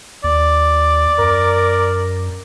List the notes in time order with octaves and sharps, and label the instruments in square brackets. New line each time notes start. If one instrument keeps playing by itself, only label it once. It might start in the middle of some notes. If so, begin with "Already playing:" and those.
[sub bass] D#2 [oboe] D5
[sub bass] F#2 [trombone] A#4